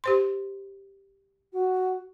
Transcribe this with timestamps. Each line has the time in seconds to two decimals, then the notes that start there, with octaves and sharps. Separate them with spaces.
0.04 G4 C5 C6
1.53 F#4